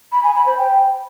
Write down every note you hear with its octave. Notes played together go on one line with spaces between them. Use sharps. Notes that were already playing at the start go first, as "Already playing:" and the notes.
B5
G#5
B5
C5
G5